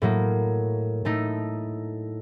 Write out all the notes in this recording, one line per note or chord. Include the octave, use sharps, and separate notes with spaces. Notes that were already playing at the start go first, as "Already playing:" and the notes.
A2 F#3 A#3
A2 A3 D#4